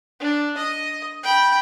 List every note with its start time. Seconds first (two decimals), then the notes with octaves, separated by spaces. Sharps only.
0.20 D4
0.57 D#5
1.24 G5 B5